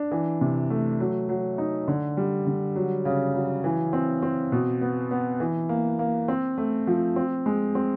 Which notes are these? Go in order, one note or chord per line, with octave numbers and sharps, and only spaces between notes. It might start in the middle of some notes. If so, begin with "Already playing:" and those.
Already playing: D4
E3
C3
A3
F#3
F#3
D#4
D3
G3
D3
F#3
C#3
F#3
E3
C4
C4
B2
B3
B3
E3
A#3
A#3
C4
A3
F3
C4
G#3
C4